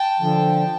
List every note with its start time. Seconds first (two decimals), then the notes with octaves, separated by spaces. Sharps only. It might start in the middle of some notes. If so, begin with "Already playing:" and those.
Already playing: G5 A5
0.20 D3 F3